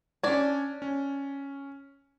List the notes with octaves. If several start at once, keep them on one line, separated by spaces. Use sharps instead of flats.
C#4 D4 D5 G#6
C#4